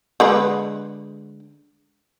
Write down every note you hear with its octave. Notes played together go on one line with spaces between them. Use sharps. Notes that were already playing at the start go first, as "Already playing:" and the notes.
D3 G#3 B4